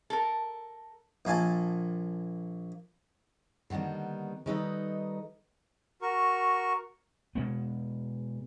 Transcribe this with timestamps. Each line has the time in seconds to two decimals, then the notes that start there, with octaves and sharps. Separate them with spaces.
0.10 A4 A#4
1.25 A#1 A#3 G#5 A5
3.70 D3 D#3 G3 A#3 B3
4.46 D#3 G3 D#4 A4 B4 D#5
6.02 F#4 A#4 C#6
7.35 B2 G#3 B3